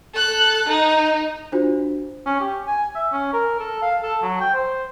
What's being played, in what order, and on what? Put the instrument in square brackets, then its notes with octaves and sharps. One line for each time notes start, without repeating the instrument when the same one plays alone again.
[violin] A4 F#6
D#4
[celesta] D4 F4 F#4 C5
[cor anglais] C#4
G4
G#5
E5
C#4
A#4
A4
F5
A4
F#3
G5
C5